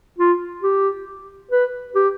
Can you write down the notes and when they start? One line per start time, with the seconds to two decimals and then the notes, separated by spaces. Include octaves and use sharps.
0.19 F4
0.63 G4
1.51 B4
1.95 G4